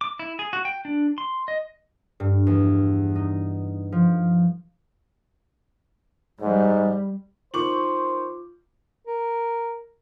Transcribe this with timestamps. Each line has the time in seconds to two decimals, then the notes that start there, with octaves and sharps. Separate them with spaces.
0.01 D6
0.19 E4
0.39 G#4
0.53 F#4
0.65 G5
0.85 D4
1.18 C6
1.48 D#5
2.20 G2
2.47 E2
3.16 D#4
3.92 F3
6.41 G#2 G3
7.54 D#3 F4 C5 C#6 D6 F#7
9.07 A#4